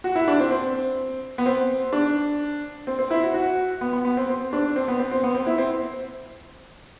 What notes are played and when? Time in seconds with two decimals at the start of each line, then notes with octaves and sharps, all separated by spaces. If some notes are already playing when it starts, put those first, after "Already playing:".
0.04 F#4
0.15 E4
0.28 D4
0.40 C4
0.51 C4
1.38 B3
1.46 C4
1.93 D4
2.87 C4
2.99 C4
3.11 E4
3.23 F#4
3.34 F#4
3.81 B3
3.93 B3
4.05 B3
4.17 C4
4.29 C4
4.53 D4
4.76 C4
4.88 B3
4.99 C4
5.11 C4
5.24 B3
5.35 C4
5.47 E4
5.58 C4